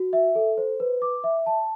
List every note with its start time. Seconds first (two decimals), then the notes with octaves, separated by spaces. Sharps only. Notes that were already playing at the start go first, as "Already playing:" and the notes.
Already playing: F#4
0.13 E5
0.35 A4
0.58 C5
0.80 B4
1.02 D6
1.24 E5
1.46 A5